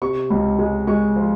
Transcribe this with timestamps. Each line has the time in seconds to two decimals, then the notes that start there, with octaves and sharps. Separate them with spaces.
0.02 C3 C#6
0.30 C#2
0.59 G#3
0.87 G#3 C#6
1.16 F3